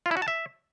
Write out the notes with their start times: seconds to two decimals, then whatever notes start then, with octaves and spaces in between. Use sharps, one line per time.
0.06 F4
0.11 E4
0.17 F#4
0.22 A5
0.28 E5